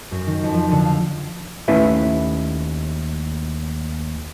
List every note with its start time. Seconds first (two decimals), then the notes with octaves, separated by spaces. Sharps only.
0.11 F#2
0.27 D#3
0.43 F2
0.54 F3
0.71 D3
0.85 F5
1.68 D#2 A3 C#4 E4 B4 E5